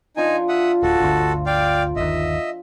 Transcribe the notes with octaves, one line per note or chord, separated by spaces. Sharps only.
F3 D4 D#4 F4 G#5
E5 F#5 D#6
D1 F#4 A4
G1 D2
D5 F5 G5
G1 D#2 D#5 E5